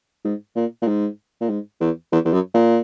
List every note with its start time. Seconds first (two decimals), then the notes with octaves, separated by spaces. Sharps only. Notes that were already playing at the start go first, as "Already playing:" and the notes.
0.25 G#2
0.56 A#2
0.82 A#2
0.88 G#2
1.41 A#2
1.50 G#2
1.80 E2
2.12 E2
2.25 E2
2.33 F#2
2.54 A#2